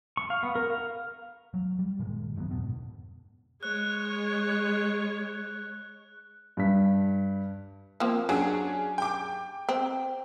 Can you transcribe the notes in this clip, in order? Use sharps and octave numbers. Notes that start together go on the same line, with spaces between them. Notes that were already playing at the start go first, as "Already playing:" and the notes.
C#6
F5
B3
A#4
F5
F#3
G3
G2 A#2 D#3 G#3
F1 D3 F#3 B3
F2 G#2 B2
G#3 C#5 F#6
G2 B6
F3 A#3 C4
F#3 C#4 D4 G#4
G5 D6
C4